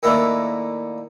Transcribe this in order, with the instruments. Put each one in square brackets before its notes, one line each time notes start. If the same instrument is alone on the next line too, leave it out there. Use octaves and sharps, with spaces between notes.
[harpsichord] D#2 A2 A#3 D4 E4